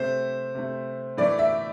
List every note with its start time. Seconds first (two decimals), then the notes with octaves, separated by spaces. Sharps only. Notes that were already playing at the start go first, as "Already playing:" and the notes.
Already playing: C3 A3 C5
0.55 C3 A3
1.17 A2 E3 A3 D5
1.39 E5